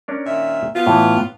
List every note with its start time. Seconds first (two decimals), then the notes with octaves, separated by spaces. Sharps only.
0.08 C#4 D4 A#4
0.26 A#2 D#3 E5
0.75 B3 F4
0.87 A2 E3